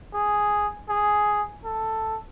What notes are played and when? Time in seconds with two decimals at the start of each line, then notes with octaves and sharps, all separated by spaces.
0.14 G#4
0.89 G#4
1.65 A4